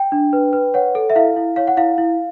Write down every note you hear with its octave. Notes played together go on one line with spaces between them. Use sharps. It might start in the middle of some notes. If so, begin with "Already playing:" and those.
Already playing: G5
D4
B4
B4
C#5 F#5
A4
E5
E4 F5
E4
C#5 F5
F#5
E4 F5
E4